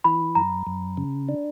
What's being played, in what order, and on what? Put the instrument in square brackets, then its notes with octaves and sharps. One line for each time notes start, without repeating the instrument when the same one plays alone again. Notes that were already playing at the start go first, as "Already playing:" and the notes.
[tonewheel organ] E3 [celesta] B5
[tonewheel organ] F#2 [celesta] A#5
[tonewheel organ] F#2
C#3
D4